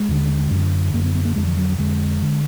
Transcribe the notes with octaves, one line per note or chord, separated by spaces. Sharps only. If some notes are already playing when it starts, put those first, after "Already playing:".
Already playing: G#3
D#2 D3
F#2 D3
F#2 D3 A#3
B3
B3
A#3
F2 D3 G#3
F3
F#3
F2 D3 G#3
D3